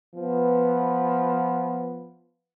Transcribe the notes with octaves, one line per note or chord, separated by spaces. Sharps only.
F3 B3